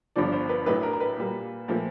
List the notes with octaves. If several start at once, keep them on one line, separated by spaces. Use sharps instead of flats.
G1 G2 D3 F3 D5
C5
B4
A1 A2 F#3 A3 D4 B4
A#4
A#4
B4
A#2 G3 A#3
A#2 F3 A3 C4